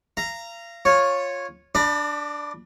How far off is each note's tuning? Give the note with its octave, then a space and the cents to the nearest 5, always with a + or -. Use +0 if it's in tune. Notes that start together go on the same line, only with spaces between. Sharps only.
F5 -35 A#5 -5
F4 +10 C#5 -10
D4 +0 D5 +35 B5 -20